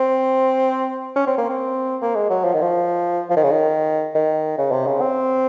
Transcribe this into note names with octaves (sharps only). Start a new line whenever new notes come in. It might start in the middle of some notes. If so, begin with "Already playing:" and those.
Already playing: C4
C#4
C4
A#3
C4
A#3
G#3
F#3
F3
D#3
F3
F3
D#3
C#3
D#3
D#3
C#3
C3
C#3
C4